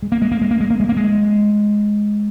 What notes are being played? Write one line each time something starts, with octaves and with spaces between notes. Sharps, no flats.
G#3
A#3
G#3
A#3
G#3
A#3
G#3
A#3
G#3
A#3
G#3